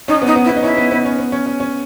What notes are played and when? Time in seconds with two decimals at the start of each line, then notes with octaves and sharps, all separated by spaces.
0.08 C#4 D#4
0.22 B3 D#4
0.36 B3
0.44 E4
0.49 B3
0.57 D#4
0.63 C#4 E4
0.77 B3
0.91 B3
1.05 C#4
1.18 B3
1.32 C#4
1.46 C#4
1.60 C#4